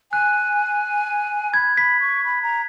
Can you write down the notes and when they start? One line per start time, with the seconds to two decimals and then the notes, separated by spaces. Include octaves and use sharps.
0.12 G#5 F#6
1.54 B5 G#6
1.77 B5 B6
2.00 C#6
2.25 B5
2.43 A#5